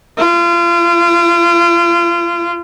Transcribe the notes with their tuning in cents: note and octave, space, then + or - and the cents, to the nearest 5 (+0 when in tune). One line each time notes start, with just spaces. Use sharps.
F4 -35